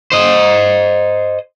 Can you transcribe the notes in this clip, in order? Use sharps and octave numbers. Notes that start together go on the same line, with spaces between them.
C5 D#5